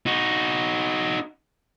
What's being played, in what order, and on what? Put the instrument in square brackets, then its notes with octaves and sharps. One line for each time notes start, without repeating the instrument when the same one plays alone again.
[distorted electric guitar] D#4 F#4